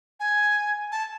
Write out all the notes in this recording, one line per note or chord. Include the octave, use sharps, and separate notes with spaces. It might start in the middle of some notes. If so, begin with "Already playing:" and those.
G#5
A5